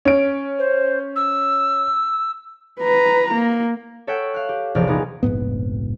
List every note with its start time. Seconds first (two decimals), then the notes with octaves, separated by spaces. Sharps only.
0.05 C#4 D7
0.59 C5
1.16 E6
2.80 B4 A#5
3.34 A#3
4.07 A4 C#5 E5 F#5 G5
4.34 F5 F#6
4.49 G4
4.75 E1 A#1 C3 F3 D5 F6
4.88 B3 D#4 G#4
5.23 F1 A#1 G#2 B3